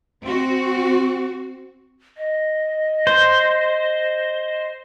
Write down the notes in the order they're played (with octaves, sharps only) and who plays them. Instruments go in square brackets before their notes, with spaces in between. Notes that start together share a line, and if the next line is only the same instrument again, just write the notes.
[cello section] C4 F#4
[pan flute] D#5
[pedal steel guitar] C5